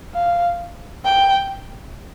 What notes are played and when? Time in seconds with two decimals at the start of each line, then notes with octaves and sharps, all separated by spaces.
0.15 F5
1.05 G5